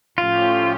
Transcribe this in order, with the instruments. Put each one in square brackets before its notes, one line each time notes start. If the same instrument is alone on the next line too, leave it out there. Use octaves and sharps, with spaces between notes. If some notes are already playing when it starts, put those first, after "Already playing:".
[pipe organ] A2 F3 A3 C#4 G4 [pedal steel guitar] F4